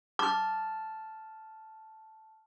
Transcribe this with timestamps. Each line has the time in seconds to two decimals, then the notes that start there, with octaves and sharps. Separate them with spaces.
0.19 A5 D6 F6